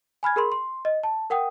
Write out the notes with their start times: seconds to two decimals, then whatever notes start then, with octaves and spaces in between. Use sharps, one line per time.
0.23 G#5 B5 F6 G#6
0.36 G#4 A#4 B5 C6
0.52 C6
0.85 D#5
1.04 A5
1.30 A#4 F#5 G5 D#6